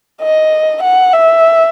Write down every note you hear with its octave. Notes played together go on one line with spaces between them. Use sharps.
D#5
F#5
E5